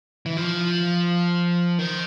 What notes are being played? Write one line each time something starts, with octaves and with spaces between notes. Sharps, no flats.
E3
F3
D#3